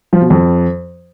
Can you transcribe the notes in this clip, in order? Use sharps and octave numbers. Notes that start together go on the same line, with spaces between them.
F3
B2
F2